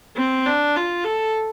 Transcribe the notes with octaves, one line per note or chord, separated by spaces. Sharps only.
C4
D4
F4
A4